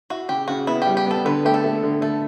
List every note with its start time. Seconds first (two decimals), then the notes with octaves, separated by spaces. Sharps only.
0.10 E4 F#4
0.29 C#3 G4
0.48 C#3 F#4
0.67 B3 E4
0.82 G3 G4
0.97 G4
1.06 B3 A4
1.25 D3 B4
1.45 A3 G4
1.54 A4
1.64 A3
1.83 D3
2.02 A3 A4